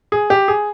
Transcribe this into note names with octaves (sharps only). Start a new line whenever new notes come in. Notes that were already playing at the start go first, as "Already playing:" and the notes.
G#4
G4
G#4